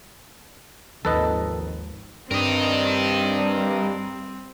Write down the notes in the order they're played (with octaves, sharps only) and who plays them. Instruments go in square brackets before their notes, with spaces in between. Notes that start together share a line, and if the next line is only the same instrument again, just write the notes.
[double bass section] G#1 D#2 F3 [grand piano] D#3 [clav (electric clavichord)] A4 B4 D#5
[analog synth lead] G2 [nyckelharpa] C4 [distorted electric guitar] A#4 D#5